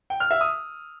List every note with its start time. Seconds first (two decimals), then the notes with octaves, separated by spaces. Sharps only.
0.10 G5
0.20 F6
0.31 E5
0.41 D#6